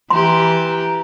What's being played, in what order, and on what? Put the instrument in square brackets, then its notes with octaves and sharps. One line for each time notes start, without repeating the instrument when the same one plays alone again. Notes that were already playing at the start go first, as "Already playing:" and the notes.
[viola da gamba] E3 G4 [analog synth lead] A#5 [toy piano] C6